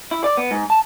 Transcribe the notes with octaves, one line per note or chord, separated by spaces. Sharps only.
E4
D5
B3
G#2
A5